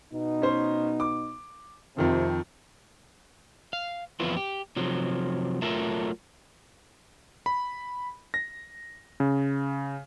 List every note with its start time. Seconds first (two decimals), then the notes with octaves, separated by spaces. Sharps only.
0.13 B2 B3 D#4
0.42 C#4 C5
1.00 D6
1.97 F2 C3 D#3 F3
3.73 F5
4.20 F2 E3 F3 B3 E4 F4
4.37 G4
4.76 C3 F3 F#3
5.62 F#3 A3 F4 A4 A#4 E5
7.46 B5
8.34 A#6
9.20 C#3